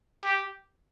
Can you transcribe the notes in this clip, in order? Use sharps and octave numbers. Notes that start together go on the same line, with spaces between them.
G4